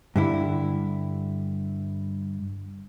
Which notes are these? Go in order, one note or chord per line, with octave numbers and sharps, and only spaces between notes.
G2 D3 E4